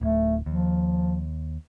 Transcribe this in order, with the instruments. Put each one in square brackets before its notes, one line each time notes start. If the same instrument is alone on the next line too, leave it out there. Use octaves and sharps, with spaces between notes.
[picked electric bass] D1 [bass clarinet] A3
[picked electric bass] D#2 [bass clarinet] F3